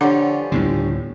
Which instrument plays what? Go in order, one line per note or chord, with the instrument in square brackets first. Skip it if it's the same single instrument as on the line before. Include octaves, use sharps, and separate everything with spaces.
[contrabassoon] D3 [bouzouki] F3 G3 C#4 [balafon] D4 F#5 D6
[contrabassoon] G1 [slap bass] D2 A2 C#3 [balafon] E4